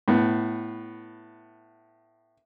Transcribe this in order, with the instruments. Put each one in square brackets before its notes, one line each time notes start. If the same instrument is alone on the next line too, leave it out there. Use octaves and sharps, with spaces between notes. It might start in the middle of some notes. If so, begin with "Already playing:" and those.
[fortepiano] A2 B3